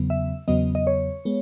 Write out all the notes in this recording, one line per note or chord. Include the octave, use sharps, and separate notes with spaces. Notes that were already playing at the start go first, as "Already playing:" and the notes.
Already playing: E2 C#3 F#3 B3
E5
E2 C#3 F#3 B3 D#5
D#5
C#5
G#3 B3